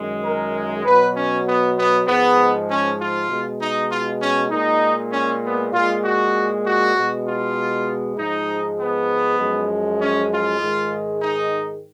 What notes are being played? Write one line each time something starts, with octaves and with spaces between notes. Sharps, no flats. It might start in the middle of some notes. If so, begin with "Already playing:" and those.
Already playing: F#2 D#3 G#3
A#4
B2 F#3 B4
C#4
B3
B3
G#2 F3 G#3 B3
C#4
F4
B2 G#3
D#4
F4
C#4
A#2 G#3 D#4
C#4
B3
A#2 G#3 F4
F#4
F#4
B2 G#3
F4
G#2 F3 G#3 D#4
B3
F#2 F3 G#3
C#4
F4
G#2 D#3 G#3
D#4